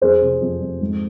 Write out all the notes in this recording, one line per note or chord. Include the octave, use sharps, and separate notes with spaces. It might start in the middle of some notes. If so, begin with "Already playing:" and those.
F2 G#4 C5
C3
F2
F2
G#2